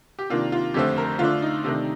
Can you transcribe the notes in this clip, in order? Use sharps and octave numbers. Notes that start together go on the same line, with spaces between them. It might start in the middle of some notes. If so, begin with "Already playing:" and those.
G4
C3 D#3 A#3 D4 F4
F4
F2 D3 A3 C4 G4
A#4
D3 A3 D4 F4
D#4
C3 D#3 A3 D4